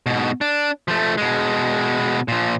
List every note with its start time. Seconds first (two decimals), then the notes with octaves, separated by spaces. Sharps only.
0.06 G#2 B2
0.41 D4
0.88 F3 A3
1.18 B2 G#3
2.28 A#2 F3